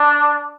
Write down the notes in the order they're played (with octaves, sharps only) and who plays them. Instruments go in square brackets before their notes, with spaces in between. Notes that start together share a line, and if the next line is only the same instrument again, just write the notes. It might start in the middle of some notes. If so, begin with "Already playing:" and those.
Already playing: [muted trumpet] D4